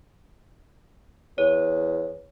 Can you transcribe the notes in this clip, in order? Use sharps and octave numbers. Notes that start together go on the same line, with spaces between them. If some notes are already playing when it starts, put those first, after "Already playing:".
E2 C#5